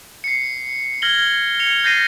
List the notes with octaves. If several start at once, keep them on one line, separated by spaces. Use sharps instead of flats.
C7 C#7
F6 G#6 A#6 F#7 G7
G#6 C#7 F7
G6 A6 A#6 C7 D#7